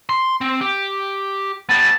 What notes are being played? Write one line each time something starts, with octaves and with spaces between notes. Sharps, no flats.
C6
C4
G4
G3 B3 A5